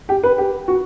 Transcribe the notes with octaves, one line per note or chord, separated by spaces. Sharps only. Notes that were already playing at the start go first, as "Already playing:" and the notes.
G4
B4
G4
F#4